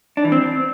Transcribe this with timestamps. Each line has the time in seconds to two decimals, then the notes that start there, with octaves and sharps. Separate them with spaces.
0.17 D4
0.25 E3
0.32 C4